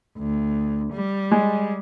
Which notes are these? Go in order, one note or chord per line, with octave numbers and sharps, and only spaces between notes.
D2
G3
G#3